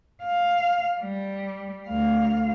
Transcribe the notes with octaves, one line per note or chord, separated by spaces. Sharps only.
F5
G3
D2 F5